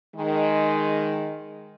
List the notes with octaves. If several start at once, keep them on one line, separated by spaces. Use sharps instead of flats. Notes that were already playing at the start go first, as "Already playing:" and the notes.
D#3 G#3